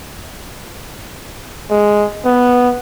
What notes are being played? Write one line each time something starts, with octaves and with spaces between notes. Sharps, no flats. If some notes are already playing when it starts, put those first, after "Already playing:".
G#3
B3